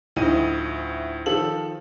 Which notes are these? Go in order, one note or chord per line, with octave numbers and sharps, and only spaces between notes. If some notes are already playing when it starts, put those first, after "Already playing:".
D2 A2 F3 D#4 D#5 D#7
D#3 F3 A4 E6 F#7